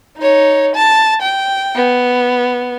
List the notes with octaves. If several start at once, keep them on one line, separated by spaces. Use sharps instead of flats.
D#4 C#5
A5
G5
B3